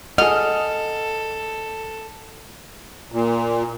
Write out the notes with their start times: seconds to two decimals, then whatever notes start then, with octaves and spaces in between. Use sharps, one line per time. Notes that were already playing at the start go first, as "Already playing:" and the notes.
0.18 G#4 A4 D#5 F#5 F6
3.12 A#2